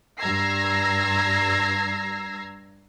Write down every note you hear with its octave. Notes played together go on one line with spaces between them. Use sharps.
G2 A#5 E6 G#6 A#6 C7